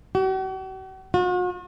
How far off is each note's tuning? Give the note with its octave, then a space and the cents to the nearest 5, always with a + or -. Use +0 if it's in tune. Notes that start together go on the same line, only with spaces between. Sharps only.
F#4 +45
F#4 -45